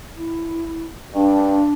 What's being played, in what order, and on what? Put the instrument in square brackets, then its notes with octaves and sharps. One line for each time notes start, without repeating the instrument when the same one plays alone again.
[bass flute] E4
[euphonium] G2 [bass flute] D4